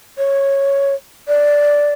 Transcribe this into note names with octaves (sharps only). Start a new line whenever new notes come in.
C#5
D5